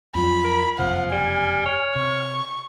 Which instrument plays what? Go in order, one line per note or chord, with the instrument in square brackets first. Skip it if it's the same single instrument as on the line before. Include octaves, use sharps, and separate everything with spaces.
[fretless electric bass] F2 F#3 [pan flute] F4 [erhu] B5
[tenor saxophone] A#4
[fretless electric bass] F#1 F2 C3 [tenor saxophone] F3 [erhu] F#5 [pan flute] F6
[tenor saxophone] G3 [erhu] G#5
[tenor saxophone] C#5
[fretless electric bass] C3 [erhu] C#6